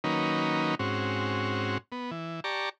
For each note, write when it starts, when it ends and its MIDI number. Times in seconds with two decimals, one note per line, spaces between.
0.04 0.75 51
0.04 0.75 54
0.04 0.75 58
0.04 0.75 61
0.04 0.75 63
0.04 0.75 71
0.79 1.78 44
0.79 1.78 60
0.79 1.78 61
0.79 1.78 66
1.92 2.11 59
2.11 2.40 52
2.44 2.69 67
2.44 2.69 74
2.44 2.69 81
2.44 2.69 82
2.44 2.69 85